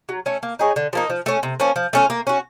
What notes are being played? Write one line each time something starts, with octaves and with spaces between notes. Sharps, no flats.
F#3
A3 C#4
A#3
D#4 G#4 C#5
D3
F3 A#3 D#4
F3
A3 C#4
C3
F3 A#3 C#4
F3
A3 C#4 F4
A#3
C#4 F#4